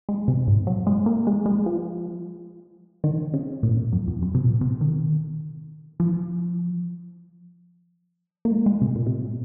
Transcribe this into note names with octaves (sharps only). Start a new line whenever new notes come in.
G#3
C3
G#2
F#3
G#3
A#3
G#3
G#3
F3
D#3
C#3
A#2
F#2
F2
F#2
C3
A#2
C3
D#3
F3
A#3
G#3
G#3
C3
A#2
C3
A#2